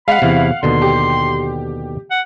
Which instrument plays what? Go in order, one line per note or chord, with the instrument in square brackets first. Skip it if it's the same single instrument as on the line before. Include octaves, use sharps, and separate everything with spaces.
[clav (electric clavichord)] G#3 [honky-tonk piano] F5 F#5 [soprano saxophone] B5
[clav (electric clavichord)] E2 C3 [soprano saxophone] E4
[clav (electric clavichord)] D#2 B2 D3 [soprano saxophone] C6
[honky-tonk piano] G4
[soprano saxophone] F#5